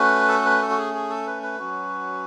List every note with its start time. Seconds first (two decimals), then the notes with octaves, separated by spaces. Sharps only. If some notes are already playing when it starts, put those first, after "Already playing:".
Already playing: A3 C#4 F#4 B4
0.28 A4
0.45 B4
0.62 A4
0.70 F#4
0.78 G#4
0.94 G#4
1.10 A4
1.27 B4
1.43 B4
1.59 F#3 C#4 F#4